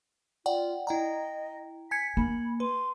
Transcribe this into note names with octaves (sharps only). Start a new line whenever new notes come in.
F4 D5 F#5 G5
E4 D#5 G5 A#5
G#5 G#6 B6 C#7
A#3 B5
B4 C6